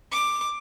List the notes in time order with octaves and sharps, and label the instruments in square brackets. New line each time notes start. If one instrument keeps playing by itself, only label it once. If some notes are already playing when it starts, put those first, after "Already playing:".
[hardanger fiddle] D6